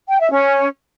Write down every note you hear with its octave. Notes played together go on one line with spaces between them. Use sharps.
G5
E5
C#4